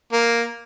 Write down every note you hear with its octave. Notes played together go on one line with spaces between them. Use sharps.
A#3